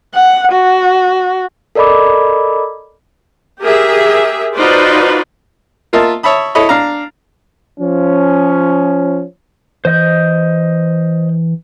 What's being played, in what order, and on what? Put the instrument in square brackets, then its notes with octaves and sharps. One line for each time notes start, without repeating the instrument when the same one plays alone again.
[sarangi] F#5
F#4
[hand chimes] A4 A#4 D5 D#5 B5 D6
[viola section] G4 G#4 A#4 E5
D#4 F4 F#4 B4 C5 D5
[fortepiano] A#3 F4 A#4 D#5 E5 A5
C#5 E5 A5 B5 D#6
E4 A4 C#5 D#5 B5
D4 F5 A#5
[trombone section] F3 C#4
[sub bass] E3 [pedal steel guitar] C5 D#5 G6